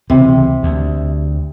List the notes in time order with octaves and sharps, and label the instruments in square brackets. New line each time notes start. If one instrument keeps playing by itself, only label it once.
[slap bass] C#2 E3 [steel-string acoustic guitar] C3
[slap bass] D2